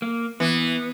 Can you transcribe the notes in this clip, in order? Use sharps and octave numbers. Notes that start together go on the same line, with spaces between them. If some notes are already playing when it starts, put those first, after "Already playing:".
A#3
E3 B3